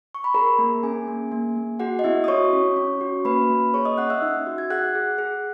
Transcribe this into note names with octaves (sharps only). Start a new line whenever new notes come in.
C#6
B5
G#4 A#4 A#5
A#3
C#4 G#4 G#5
A#3
A#3
A#3
F#4 G#4 F#5
D#5
B3 E4 E5
D#6
F#4 C#5 C#6
C#4
C#4
F#4
A#3 B4 B5
A#3
G#4 C#5 C#6
D#5 D#6
C#4 F#5 F#6
E5 E6
D#4
F#4
G#6
G#4 F#5 F#6
G#4
G#4